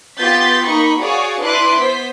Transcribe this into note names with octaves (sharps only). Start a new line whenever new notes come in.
B3 F4 G4 G6 A6 B6
A#3 D#4 B5 C#6
F#4 G#4 C#5 D5 F5
D4 E4 B4 C6 D6 F#6
B3 C5 B6